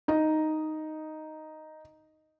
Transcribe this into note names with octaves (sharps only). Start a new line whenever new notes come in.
D#4 D#5